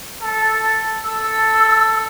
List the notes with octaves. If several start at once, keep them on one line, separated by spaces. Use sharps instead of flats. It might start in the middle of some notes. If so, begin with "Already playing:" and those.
A4
A4 E6